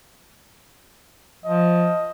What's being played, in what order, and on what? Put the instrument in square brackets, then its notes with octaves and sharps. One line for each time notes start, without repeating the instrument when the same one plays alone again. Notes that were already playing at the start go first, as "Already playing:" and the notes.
[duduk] F3 [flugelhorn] D#5